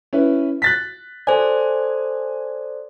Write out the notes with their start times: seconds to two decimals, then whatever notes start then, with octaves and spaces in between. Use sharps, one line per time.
0.13 C#4 E4 B4
0.62 F#6 A6 B6
1.27 A4 C5 D5 G#5